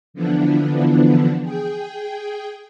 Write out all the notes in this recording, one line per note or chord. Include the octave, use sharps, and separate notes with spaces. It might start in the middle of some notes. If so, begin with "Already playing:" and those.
D3 E3 F3 B3 D4
G#4 G5